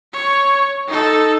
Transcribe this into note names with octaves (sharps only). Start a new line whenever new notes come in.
C#5
D#4 A4